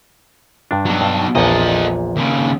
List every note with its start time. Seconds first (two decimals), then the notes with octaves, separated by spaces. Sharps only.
0.71 G2 D4
0.85 B2 F#3
1.01 G2 F5 A5
1.35 A#1 E2 A#2 A4 D#5
2.16 D#2 C#3